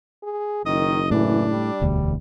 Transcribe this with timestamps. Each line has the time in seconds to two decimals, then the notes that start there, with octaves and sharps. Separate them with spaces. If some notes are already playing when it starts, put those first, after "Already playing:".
0.23 G#4
0.66 F#1 D#3 D#5
1.11 A2 E3 D4
1.52 G3
1.82 E1 D2